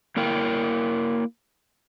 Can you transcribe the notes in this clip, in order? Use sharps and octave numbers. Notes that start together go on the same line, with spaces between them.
A#3 E4 A#4 G5